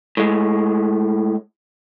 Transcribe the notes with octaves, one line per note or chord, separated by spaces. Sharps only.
A2 G#3